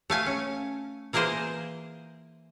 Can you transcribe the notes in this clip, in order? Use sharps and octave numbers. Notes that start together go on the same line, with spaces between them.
A3 F5 G#5
C#4
E3 A#3 G#4 A#4 C5